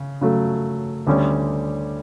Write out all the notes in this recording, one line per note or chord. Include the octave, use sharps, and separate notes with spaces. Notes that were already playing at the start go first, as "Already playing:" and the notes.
Already playing: C#3
C#3 F#3 A3
D2 D3 G3 C#4